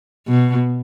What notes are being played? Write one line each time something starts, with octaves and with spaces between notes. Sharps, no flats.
B2